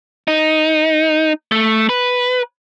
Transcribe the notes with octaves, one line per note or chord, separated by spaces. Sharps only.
D#4
A3
B4